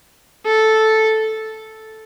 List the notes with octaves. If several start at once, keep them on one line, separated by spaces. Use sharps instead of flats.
A4